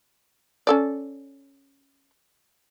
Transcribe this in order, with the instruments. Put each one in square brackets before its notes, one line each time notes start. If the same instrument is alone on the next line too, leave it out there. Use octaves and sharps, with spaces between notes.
[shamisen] C#4 A4 D5